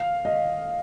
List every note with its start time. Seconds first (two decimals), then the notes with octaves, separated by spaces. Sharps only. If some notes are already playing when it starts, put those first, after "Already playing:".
Already playing: F5
0.25 D#5